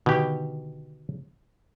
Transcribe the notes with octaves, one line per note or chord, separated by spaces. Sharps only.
B2 D3 D#3 G4